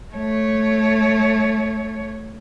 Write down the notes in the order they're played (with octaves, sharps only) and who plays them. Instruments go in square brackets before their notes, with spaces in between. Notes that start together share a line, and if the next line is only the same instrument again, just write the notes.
[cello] A3 C#5